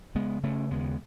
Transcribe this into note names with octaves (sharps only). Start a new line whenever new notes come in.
C#3 G#3 B3
C#3 A3 C#4
D#2 G#3 B3